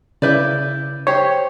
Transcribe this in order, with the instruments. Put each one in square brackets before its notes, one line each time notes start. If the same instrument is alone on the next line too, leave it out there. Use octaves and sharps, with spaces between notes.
[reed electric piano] C#3 G6 [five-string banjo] E4 B4 D5
[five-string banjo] G4 C5 [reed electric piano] C#5